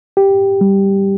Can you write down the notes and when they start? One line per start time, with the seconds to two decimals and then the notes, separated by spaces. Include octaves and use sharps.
0.17 G4
0.61 G3